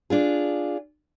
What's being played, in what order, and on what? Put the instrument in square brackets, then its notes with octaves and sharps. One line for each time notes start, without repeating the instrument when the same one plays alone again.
[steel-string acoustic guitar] D4 F4 G#4